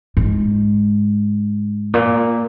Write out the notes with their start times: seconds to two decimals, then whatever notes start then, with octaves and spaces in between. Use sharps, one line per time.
0.17 G#2
1.94 A#2